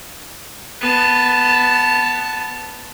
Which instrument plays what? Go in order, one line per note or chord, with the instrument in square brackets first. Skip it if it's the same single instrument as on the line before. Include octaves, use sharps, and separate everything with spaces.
[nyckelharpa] B3 A5